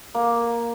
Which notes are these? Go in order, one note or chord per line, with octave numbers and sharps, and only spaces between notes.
A#3